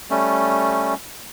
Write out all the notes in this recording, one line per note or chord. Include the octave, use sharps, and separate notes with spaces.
G3 A3 C#4